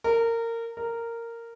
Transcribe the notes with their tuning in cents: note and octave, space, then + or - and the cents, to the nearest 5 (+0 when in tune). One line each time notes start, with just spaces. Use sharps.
A#4 -20
A#4 -10